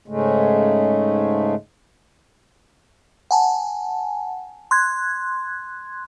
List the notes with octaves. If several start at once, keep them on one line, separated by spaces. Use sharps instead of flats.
G#2 C#3 G#3 A3
F#5 G#5 A5
C6 F#6 G#6